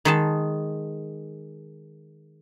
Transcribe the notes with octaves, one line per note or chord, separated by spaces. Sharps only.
D#3 G#3 A5